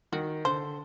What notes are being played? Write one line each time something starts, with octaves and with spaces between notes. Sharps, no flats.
D#3 F#4
D3 C5